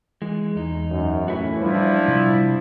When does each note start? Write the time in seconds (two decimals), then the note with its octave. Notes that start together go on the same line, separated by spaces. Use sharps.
0.22 E3 G#3
0.55 E2 D#4
0.91 F#2
1.28 A2 E3 C#4 E4 F#4
1.61 F3 G3 D4 E4
2.08 C3 G3